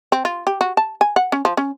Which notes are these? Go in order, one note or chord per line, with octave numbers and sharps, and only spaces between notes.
C4
F4
G4
F#4
A5
G#5
F#5
C#4
F3
C#4